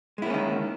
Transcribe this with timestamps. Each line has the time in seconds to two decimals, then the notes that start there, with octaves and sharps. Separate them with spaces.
0.18 G#3
0.22 E4
0.26 A#3
0.30 C#4
0.34 D#3